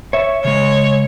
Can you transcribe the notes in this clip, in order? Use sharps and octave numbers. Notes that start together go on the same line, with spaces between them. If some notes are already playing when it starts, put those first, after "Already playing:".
C#5 E5
C#3 G#3 C#5